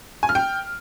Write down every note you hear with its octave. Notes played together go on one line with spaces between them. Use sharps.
G#5
F6
G5